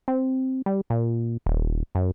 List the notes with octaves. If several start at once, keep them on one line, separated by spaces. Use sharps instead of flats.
C4
G3
A#2
D#1
F#2